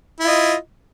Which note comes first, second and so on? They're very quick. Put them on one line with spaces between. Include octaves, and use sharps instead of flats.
E4 F4 D#5